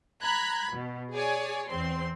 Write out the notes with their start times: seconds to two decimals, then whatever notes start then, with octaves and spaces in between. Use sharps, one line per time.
0.24 A#5 B5 F#6 G#6 B6
0.73 B2
1.11 G#4 C#5 D5 G#5
1.68 E2 C4 C6